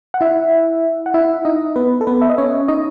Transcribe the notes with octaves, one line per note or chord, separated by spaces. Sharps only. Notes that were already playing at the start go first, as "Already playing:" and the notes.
F#5
E4 E5
F#5
E4 E5
D#4 D#5
B3 B4
A4
B3 B4
E5
D#5
C#4 C#5
D#4 D#5